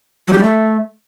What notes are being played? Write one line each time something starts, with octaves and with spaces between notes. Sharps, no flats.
F#3
G4
G3
A3